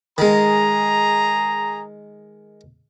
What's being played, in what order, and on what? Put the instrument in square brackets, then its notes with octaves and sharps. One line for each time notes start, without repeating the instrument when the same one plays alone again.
[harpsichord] D#3 G#3 [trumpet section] G#4 A#5